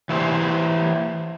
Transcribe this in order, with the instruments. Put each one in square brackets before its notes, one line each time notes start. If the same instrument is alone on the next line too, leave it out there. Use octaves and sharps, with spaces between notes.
[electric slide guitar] E3 E4 G4 C5